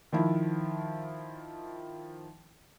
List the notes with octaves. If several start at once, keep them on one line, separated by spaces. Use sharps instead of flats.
D#3 F3 E4